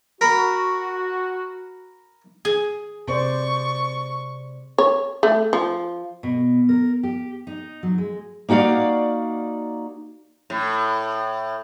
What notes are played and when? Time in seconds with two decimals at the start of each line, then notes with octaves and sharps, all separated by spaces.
0.21 F#4 A#4 B5
2.45 G#4
3.08 C3 C5 D5 C#6
4.78 C#5
5.23 A3
5.53 F3
6.23 B2
6.69 A#4
7.03 G4
7.47 D#4
7.83 F#3
7.98 G#3
8.49 A#3 D#4 F#4 D5 F5
10.50 A2